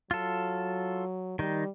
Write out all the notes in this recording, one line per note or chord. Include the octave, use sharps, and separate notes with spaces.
F#3 F4 A4
D#3 G3 D#4